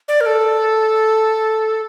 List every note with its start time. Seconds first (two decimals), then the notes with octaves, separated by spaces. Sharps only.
0.08 D5
0.21 A#4
0.26 A4